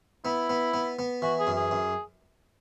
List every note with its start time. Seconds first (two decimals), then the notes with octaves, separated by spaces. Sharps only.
0.25 B3 E4
0.49 B3
0.74 B3
0.99 B3
1.22 E3 F#4
1.39 G#4
1.47 F#2
1.56 G#4
1.71 F#2